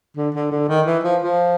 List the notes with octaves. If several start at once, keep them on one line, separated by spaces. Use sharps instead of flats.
D3
D3
D3
D#3
E3
F3
F3